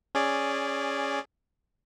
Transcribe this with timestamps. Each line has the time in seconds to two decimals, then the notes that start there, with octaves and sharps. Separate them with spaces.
0.15 C#4 G#4 D5